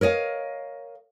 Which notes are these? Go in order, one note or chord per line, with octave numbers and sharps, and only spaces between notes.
A#4 C#5 D#5 F5